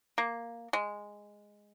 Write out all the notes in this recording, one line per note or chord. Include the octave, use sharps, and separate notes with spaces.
A#3
G#3